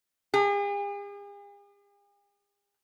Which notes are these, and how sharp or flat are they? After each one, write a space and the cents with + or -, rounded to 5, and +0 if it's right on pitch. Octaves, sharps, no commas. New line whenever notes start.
G#4 -45